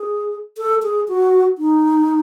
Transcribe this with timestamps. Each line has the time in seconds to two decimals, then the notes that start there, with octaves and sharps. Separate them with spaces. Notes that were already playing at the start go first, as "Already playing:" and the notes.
Already playing: G#4
0.58 A4
0.83 G#4
1.08 F#4
1.58 D#4